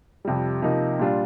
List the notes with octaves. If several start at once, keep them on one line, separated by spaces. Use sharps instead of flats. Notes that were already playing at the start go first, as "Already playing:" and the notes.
F2 C3 G3
C3 F3 A#3 D#4
A#2 G3 D4 F4